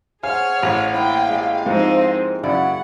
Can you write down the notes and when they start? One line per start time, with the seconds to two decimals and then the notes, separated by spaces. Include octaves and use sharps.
0.23 G#4 C5 C#5 F5 F#5 G#5 F6
0.63 A1 F5
0.94 A#3 E4 G5
1.28 G#3 G4
1.66 G#2 F3 C4 D#4 C5
2.43 F#2 C#3 E4 D5 F#5